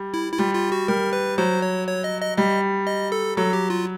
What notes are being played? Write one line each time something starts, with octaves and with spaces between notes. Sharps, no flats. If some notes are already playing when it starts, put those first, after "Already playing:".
Already playing: G3
E4
E4
G3 F4
F4
F#4
G3 A#4
B4
F#3 C5
C#5
C#5
D#5
D#5
G3 D#5
D#5
A4
F#3 A4
G4
F4